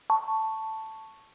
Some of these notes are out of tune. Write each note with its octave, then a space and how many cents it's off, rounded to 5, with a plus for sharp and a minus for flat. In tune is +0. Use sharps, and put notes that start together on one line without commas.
A5 +5 C#6 +0